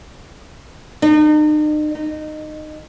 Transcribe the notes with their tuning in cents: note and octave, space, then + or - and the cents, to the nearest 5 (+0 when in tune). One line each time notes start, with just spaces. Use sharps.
D#4 -40
D#4 -20